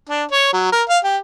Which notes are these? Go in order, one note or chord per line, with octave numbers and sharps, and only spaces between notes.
D4
C#5
F#3
A#4
F5
G4